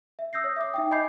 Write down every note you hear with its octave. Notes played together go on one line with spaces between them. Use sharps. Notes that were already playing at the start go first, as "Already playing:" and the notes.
E5
D#6 E6 G6 A#6 C7
C#5
E5 D6 D#6
D#4 E5 G5
D#5 G#5 B5 D6 G6 C7